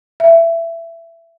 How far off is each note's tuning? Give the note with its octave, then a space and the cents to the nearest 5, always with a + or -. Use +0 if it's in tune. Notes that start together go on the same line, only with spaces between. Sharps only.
E5 +20